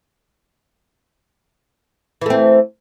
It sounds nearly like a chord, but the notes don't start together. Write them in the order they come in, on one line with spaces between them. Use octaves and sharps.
E3 A3 C4